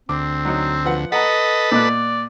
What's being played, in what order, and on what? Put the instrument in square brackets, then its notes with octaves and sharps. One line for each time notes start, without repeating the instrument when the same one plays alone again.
[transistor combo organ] D2 [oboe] C4 [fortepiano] D6
[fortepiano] F#3 D#4
F3 B4 F#5
[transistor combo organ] A4 B4 [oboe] D#5 [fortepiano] F#5 A#5
[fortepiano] A#2 D#5 F#6 [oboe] D5